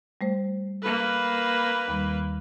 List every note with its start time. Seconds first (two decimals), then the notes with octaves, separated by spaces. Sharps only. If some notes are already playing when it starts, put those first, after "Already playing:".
0.21 G3 A3 C5
0.82 A#3 A4 B4
1.88 D#2 D#3 G3